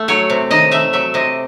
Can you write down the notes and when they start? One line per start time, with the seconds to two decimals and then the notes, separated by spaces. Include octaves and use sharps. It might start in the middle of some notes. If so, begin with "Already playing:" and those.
Already playing: A3 A4
0.08 F#3 C#5
0.30 C3
0.51 D#3 D#5
0.71 A3 E5
0.93 F#3 E5
1.14 C3 D#5